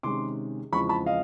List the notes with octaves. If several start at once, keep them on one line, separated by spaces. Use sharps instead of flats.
C3 D#3 G#3 C#4 C6 D6
E2 C#3 F3 G#3 C4 B5 C#6
A5 B5
D#5 F5